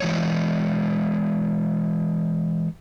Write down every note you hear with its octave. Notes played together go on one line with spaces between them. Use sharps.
E3 G#3 C#5